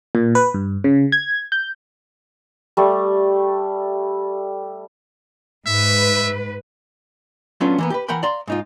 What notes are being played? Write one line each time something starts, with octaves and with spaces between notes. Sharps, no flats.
A#2
B4
G2
C#3
G#6
G6
G3 A3
G#2 B4 E5
F#3 A3 B3 C#4 D4 F4
E3 A#3 B3
G4 A#4 B4
E3 A#4 F#5 G5 B5
D5 F5 A#5 C6
G#2 D#4 F4